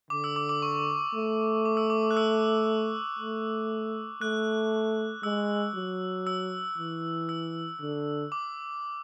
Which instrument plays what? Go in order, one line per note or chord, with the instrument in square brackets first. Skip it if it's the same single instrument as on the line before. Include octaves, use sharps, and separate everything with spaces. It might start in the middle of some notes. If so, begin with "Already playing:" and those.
[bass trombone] D3 [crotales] D6
[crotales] E6
D6
D6
C#6
[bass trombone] A3
[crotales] D6
E6
D6
D6
F#6
E6
[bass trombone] A3
[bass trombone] A3 [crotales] F#6
[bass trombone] G#3 [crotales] E6
[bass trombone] F#3
[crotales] E6
[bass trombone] E3
[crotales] E6
[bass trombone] D3
[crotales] D6